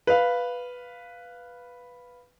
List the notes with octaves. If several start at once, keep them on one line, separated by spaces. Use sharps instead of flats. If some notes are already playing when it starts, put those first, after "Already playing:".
B4 F5